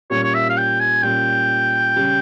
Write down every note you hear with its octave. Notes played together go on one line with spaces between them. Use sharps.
A#2 G3 C#4 C#5
C#5
E5
F5
G5
G#5
A#2 G3 C#4 G5
C#3 G3 C#4